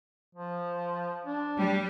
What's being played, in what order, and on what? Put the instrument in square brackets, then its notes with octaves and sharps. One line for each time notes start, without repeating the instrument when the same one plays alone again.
[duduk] F3
D4
[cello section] G3